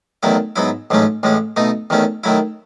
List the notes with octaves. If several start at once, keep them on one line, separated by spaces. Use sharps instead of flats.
E2 D#3 F#3 A3 E4
G#2 F#3 B3 E4
A1 G#2 F#3 A3 C#4
A1 A2 G#3 C#4
B2 A3 D#4
E2 D#3 A3 C#4
D#3 F#3 A3 E4